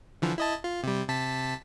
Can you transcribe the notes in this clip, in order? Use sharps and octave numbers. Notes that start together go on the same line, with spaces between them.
D3 E3 F3
E4 D#5 A5
F4
C3 G3
C3 A5 B6